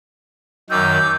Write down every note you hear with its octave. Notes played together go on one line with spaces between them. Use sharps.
F#2 D#3 D6 E6 G6